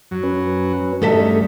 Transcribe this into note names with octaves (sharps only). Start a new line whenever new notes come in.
F#2 F#3
C#4 B4
E2 G2 D#3 G3 A3 A4 E5